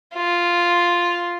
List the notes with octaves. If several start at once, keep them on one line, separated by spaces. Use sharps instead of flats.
F4